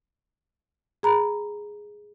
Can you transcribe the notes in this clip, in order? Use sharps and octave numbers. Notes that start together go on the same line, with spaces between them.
G#4 A#5 B5